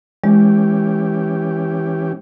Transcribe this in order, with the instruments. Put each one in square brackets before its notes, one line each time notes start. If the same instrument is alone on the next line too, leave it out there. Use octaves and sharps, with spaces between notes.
[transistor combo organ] E3 C#4 G4 [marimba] G#3